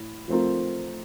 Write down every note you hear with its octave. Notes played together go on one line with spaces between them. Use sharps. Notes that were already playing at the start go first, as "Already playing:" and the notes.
Already playing: A2
F3 A3 C4 F4 A#4